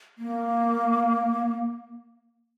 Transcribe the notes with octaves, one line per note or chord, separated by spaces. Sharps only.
A#3